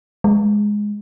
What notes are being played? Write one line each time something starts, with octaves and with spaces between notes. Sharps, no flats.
G#3